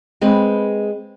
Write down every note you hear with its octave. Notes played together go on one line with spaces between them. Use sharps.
G#3 C4 B4